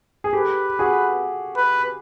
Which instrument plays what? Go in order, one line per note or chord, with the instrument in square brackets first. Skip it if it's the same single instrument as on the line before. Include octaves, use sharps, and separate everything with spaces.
[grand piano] G#4
[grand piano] G4 A4 [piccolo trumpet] B4
[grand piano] F#4 G#4
[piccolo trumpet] B4